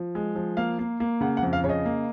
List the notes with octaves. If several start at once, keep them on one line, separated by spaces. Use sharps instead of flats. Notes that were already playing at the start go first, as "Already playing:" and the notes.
Already playing: F3
G#3
F3
A#3 F5
A#3
A#3
C#3 F#5
F#5
F2
F5
C#3 C#5
D#5
A#3